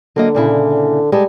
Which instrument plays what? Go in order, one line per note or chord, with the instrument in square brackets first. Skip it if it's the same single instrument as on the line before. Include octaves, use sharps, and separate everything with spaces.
[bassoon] D3 [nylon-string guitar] F#3 A#3 D#5
[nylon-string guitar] A#2 C#3 E4
[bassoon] G3 [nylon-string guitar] G#3 A4